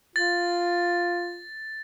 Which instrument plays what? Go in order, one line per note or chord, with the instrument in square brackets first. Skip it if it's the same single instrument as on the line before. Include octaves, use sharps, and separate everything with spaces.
[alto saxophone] F4 [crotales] A6